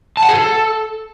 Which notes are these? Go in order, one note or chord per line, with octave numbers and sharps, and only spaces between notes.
A5
F#5
G#4
A4